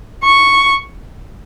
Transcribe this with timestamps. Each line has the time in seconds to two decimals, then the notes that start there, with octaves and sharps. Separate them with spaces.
0.23 C#6